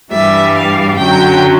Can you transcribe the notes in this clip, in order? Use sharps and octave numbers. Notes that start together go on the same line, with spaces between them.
G2 E3 G3 E5
F5
F#2 D3 F#3 G5